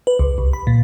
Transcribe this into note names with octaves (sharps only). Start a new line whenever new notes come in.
B4
C#2
C2
B5
A#2